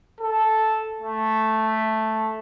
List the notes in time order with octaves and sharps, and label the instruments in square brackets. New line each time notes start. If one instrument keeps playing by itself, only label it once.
[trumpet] A4
A3